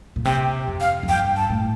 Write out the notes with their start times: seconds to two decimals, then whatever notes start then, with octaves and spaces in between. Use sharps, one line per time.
0.16 A#2
0.25 C3 G5
0.67 F2
0.80 F5
1.03 F2
1.08 G2 G5
1.36 A5
1.50 A2